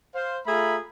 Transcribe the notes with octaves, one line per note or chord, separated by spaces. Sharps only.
C5 F5
A3 F4 G#4 E5 A#5 B5